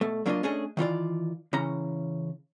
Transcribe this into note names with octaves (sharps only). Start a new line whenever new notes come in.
B2 A3
F#3 A#3 D4 E4 F4 D#5
A3 C#4 D4 G#4 D#5
D#3 E3 F4 D5
C#3 E3 C#4 A#5